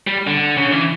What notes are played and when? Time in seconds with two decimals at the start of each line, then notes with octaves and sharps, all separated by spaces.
0.07 G3
0.27 D3
0.57 C#3
0.72 E3